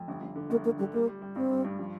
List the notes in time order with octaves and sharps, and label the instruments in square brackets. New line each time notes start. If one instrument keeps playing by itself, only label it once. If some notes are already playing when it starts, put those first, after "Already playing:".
Already playing: [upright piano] F2
G1
G1
D3
[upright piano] G1 [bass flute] A#3
[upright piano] D3 [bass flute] A#3
[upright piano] D3 [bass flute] G3
[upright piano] G3 [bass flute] A#3
[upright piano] G3
G3
[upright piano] G2 [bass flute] C4
[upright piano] G3
G2
F3